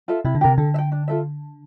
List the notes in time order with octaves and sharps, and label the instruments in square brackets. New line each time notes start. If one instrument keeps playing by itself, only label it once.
[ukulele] F4 A4 E5
[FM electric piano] C3 [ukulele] E4
[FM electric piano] D3
[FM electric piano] C3 [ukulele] G4 A#4
[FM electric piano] D3 [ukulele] A4
[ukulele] E5
G5
D4
F4 A4 E5